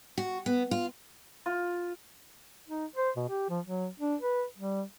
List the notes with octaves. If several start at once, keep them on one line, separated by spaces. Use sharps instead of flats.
F#4
B3
F4
F4
D#4
C5
B2
G4
F3
F#3
D4
B4
G3